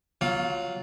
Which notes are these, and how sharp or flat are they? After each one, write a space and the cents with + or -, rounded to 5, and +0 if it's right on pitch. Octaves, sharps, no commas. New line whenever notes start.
F#3 +0 F4 +0 F5 +40